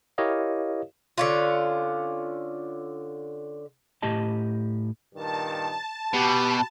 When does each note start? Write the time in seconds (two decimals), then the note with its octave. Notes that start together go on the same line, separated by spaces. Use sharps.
0.18 E4 G4 A#4 C#5 D#5 F5
1.18 D3 C#4 F4
4.02 A2 G4 D#5 A5
5.15 G2 A#2 D#3 A5
6.13 B2 F#4 G4 B5